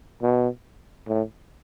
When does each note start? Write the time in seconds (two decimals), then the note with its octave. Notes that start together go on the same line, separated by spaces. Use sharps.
0.22 B2
1.08 A2